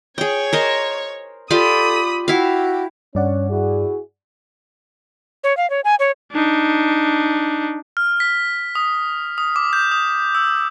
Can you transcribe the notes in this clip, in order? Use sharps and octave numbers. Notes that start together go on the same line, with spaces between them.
G#4 C#5 G5
A#4 C5 D#5
F4 G4 A4 D5 B5 D#6
E4 F#4 G4 F5
G2 C#4 C#5 D5 F#5
E4 F#4 G#4
C#5
F5
C#5
G#5
C#5
D4 D#4
F6
B6
D#6
D#6
D6
G6
D#6
E6